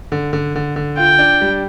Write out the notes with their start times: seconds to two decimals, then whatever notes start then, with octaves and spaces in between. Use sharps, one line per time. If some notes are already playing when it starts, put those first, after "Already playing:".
0.12 D3
0.33 D3
0.55 D3
0.76 D3
0.97 F4 G5
1.19 D4
1.41 G3